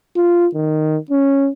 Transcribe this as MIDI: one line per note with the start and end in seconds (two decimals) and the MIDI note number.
0.16 0.47 65
0.55 0.97 51
1.11 1.49 61